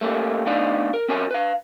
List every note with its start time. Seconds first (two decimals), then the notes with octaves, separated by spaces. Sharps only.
0.01 A3 A#3 C#4 G4
0.46 A3 B3 D4 D#4 D5 F5
0.94 A#4
1.08 C4 C#4 F#4 A#4 C#5 G#5
1.31 B4 F5